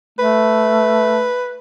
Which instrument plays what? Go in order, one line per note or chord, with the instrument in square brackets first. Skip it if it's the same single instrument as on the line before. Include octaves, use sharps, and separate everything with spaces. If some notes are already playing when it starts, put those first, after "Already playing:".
[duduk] A3 [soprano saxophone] B4